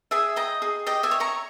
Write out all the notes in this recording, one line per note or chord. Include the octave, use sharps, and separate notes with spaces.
G#4 E5 G#5
D#5 G5 A#5
G#4
G4 D#5 G5
E5 G#5
C#5
A#5 C#6